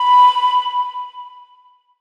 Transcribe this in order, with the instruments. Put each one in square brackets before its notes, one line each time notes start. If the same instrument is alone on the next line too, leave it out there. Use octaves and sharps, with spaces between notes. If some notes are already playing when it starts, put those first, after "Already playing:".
Already playing: [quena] B5